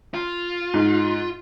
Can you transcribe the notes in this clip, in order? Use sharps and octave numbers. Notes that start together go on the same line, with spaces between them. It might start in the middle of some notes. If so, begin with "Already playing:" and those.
F4
G#2